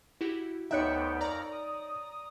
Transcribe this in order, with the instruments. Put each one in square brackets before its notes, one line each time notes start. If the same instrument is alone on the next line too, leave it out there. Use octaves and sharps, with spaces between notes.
[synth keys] E4 F#4 G4
[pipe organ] D2 B3 G5 [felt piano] D#4 C#5 [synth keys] E5 F#6 C#7
[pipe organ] F2 A#4 A#6 [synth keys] D5 A#5
[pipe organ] D#6